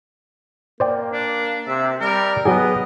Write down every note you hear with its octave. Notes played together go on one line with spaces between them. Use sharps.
A#3 C5 D5 G5
D4
C3 E5
G3 A#4
F#3 B3 G4 G#4 D#5